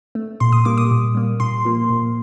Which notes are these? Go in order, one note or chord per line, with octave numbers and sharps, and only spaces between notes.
A3
A#2 C6
D#6
G3 A#3 D6
D#6
A#2
G3 A#3
A#2 C6
F3 A#3
A#2